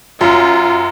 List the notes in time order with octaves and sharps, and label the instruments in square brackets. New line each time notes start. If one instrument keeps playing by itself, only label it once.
[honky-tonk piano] F#2 [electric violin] F4